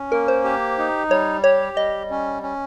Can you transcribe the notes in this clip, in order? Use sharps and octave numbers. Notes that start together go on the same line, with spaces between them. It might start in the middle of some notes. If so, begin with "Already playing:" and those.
Already playing: C#4
A#3 A#4
C5
G4
D#4
G3 C#5
G4 C#5
G3 D#5
C#4
C#4